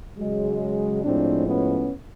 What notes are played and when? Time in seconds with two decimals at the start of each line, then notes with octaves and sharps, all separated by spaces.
0.18 C#3 F#3 G#3
1.03 A2 F3 G#3 C4 D4
1.47 B3 C#4